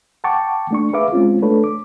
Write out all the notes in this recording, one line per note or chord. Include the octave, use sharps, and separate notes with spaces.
F#5 G5 A5 C#6 D6
A3 D4 C#6
G#4 B4 E5 F5 D6
G#3 C4 C#4 F4
A3 D4 A4 B4 C#5
D6